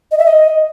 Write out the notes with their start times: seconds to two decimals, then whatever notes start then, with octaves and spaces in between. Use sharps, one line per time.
0.12 D#5
0.18 E5
0.26 D#5